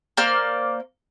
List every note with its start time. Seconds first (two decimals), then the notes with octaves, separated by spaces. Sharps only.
0.17 A#3 C5 D5 F6